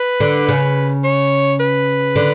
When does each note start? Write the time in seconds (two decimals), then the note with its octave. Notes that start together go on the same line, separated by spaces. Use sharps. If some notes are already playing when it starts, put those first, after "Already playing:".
Already playing: B4
0.20 D3
0.48 C#3
1.04 C#5
1.60 B4
2.16 D3